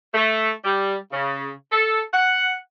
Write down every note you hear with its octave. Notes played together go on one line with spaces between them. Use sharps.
A3
G3
C#3
A4
F#5